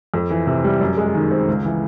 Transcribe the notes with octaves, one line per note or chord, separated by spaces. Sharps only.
F2
E3
C3
G3
F#2
G#3
D#3
C4
C#2
E3